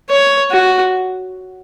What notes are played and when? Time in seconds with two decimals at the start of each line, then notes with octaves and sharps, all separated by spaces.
0.10 C#5
0.51 F#4